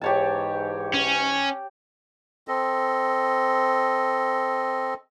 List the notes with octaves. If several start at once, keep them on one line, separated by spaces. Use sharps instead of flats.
G#2 E3 G4 C#5 A5
C#4
C4 A4 D#5